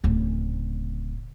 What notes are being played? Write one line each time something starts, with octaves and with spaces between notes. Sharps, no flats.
D1 C#3